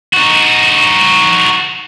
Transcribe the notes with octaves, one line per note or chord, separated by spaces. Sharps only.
D#4 F#4